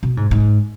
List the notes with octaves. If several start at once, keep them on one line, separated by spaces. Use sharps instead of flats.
B2
G#2
G#2